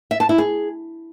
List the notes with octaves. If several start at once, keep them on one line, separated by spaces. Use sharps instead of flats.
E5
A5
E4
G#4